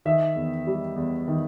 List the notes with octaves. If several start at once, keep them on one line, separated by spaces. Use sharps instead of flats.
D#3 E5
E2
G3
E2
D#3